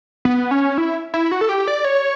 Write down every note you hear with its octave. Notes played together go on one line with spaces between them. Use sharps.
B3
C#4
E4
E4
F#4
A4
G4
D5
C#5